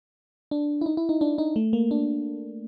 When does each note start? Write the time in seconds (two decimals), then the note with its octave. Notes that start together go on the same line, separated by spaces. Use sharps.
0.51 D4
0.81 E4
0.86 D#4
0.97 E4
1.09 D#4
1.21 D4
1.38 D#4
1.56 A3
1.73 A#3
1.91 D4